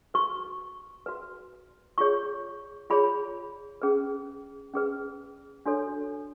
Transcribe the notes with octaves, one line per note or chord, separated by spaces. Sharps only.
F#4 B4 C#6
F#4 B4
F4 G#4 C#5 C#6
F4 G#4 C#5 B5
C#4 G#4 B4
C#4 G#4 B4
D4 F#4 A4 C#5